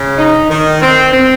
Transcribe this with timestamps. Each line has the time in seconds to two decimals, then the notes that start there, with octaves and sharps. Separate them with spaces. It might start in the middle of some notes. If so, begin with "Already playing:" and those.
Already playing: C#3
0.18 D#4
0.50 D#3
0.82 C4
1.13 C4